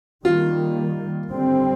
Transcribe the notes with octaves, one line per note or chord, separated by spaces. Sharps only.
D#3 G3 A#3 F4
D3 G3 C4